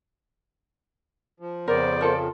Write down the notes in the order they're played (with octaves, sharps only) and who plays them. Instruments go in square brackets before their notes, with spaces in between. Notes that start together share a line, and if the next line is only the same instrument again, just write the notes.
[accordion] F3
[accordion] F2 C#3 [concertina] B3 C5 [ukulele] A#4 [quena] D5
[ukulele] F4 A4 A#4